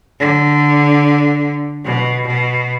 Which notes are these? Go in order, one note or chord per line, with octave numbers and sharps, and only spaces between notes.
D3
B2
B2